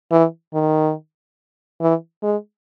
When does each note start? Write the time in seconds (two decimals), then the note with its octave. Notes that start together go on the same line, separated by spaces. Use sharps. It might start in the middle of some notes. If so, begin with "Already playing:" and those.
0.12 E3
0.54 D#3
1.81 E3
2.23 G#3